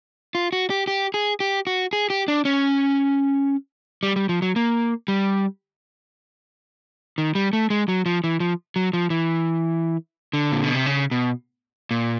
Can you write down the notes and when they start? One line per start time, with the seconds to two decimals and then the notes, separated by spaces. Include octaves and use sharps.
0.35 F4
0.53 F#4
0.70 G4
0.87 G4
1.14 G#4
1.40 G4
1.67 F#4
1.93 G#4
2.10 G4
2.28 D4
2.45 C#4
4.03 G3
4.16 G3
4.29 F3
4.42 F#3
4.56 A#3
5.08 G3
7.18 D#3
7.35 G3
7.53 A3
7.70 G#3
7.89 F#3
8.06 F3
8.24 E3
8.40 F3
8.76 F#3
8.93 F3
9.10 E3
10.33 D3
10.52 A#2
10.64 B2
10.75 C3
10.86 C#3
11.11 B2
11.91 A#2